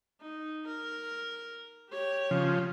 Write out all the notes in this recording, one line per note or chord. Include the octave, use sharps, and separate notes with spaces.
D#4
A#4
G4 C#5
C#3 F3